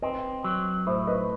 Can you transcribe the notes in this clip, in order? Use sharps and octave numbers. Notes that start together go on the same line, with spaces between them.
C4 B4 D#5
F#3
A2 C5 E5
B4 D#5